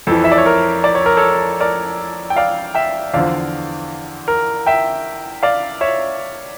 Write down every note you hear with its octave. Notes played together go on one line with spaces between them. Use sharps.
F2 E3 A4
E5
D5
C#5
A#4
D5
C#5
A#4
A4 C#5
A#4 D5
G5
D5 F5
E5 G5
E2 D3 F3 D5 F5
A#4
E5 G5
D5 F5
C#5 E5